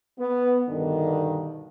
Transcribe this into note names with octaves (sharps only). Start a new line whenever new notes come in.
B3
G2 B2 D3 D#3